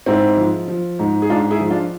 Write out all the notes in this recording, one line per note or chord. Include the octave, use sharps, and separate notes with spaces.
G#2 C4 E4
F3
F3
G#2
G#4
G#2 D4 F4
E4 G#4
F3
D4 F4